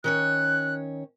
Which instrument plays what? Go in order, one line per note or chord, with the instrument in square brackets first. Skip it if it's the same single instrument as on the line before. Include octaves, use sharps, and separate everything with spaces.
[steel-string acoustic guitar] D#3 C#4 C#5 [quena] F#6